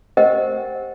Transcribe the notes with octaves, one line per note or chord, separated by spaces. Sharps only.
G4 A#4 C5 D#5 F#5 G5